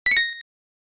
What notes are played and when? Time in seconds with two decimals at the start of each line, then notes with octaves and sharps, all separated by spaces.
0.06 B6
0.11 C#7
0.17 A#6